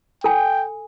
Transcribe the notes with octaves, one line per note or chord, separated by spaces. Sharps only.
A4 G5 G#5